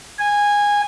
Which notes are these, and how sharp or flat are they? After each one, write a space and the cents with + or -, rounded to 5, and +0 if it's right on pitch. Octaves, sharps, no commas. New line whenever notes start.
G#5 -15